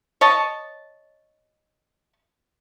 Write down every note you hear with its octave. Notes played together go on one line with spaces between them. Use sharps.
C#5 D#5 A5